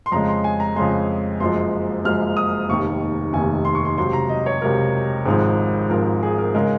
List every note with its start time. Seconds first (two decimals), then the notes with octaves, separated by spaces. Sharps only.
0.06 C6
0.12 F2 C#3 G#3 A#5
0.28 C6
0.44 G#5
0.60 A#5
0.76 F2 C#3 G#3 C6
1.40 F#1 F#2 F3 G#3 C6
2.04 F#1 F#2 F3 G#3 F6
2.37 D#6
2.69 F1 D#2 D#3 C#6
3.33 F1 D#2 D#3 G#5
3.65 C6
3.75 C#6
3.85 C6
3.98 C#2 C3 F#3 C6
4.13 A#5
4.29 D#5
4.46 C#5
4.61 C#2 C3 F#3 A#4
5.25 G#1 G#2 F3 G#4
5.90 G#1 G#2 F3 A#4
6.23 G#4
6.38 A#4
6.54 C#3 G#3 A#4